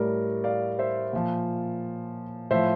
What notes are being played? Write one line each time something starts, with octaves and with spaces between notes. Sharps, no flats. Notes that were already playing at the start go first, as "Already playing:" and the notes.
Already playing: A2 G3 A#4 D5
D5 F5
C5 E5
A#2 F3
A2 F3 C5 E5